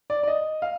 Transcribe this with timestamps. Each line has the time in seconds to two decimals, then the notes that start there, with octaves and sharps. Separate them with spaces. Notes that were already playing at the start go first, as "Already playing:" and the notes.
0.10 D5
0.23 D5
0.28 D#5
0.62 F5